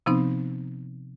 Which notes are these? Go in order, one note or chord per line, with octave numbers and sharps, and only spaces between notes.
C3 F3 B3 C4 D#4